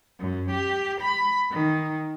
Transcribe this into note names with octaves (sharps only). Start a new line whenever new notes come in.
F#2
G4
B5
D#3